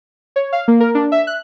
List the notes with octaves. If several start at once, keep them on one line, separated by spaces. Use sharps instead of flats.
C#5
F5
A#3
A#4
D4
E5
F#6